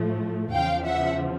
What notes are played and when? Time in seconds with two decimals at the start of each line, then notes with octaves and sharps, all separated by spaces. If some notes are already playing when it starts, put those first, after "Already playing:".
Already playing: A2 F3 A3
0.54 E2 C#3 F3 F5 G5
0.86 E5 F#5